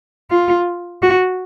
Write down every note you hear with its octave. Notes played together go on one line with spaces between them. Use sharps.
F4
F#4